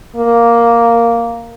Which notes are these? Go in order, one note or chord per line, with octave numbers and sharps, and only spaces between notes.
A#3